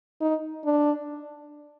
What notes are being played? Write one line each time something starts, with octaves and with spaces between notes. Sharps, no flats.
D#4
D4